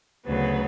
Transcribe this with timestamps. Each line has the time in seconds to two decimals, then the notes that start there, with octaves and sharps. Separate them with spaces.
0.26 D2 C#3 F#3 B3